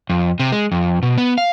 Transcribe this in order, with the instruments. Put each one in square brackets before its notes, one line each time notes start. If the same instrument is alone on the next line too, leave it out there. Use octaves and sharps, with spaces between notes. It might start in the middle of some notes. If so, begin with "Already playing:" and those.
[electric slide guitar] F2
C3
G#3
F2
B2
B3
F5